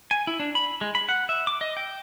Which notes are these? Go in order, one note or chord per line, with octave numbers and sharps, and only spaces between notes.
G#5
E4
D4
B5
G#3
B5
F#5
E5
D6
D#5
G5